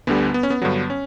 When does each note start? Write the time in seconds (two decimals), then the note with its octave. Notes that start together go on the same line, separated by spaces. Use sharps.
0.07 D2 D3 G3 B3
0.34 B3
0.43 C#4
0.50 B3
0.62 G2 D3 F#3 B3
0.90 C#4